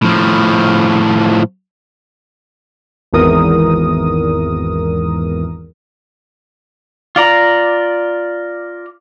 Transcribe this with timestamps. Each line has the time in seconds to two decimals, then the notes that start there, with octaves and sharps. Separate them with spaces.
0.02 A2 F3
3.13 G#1 E2 A#4 D#6
7.16 F4 D5 A#5